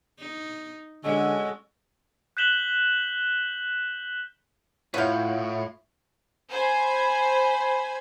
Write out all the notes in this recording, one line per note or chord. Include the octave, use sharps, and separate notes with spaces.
D#4
D3 G#3 C#4 F#4 A4 D#5
F#6 G6 B6 E7 F#7 G7
A2 E4 F4 B4 C#5 F5 F#5 G6
C5 G#5 B5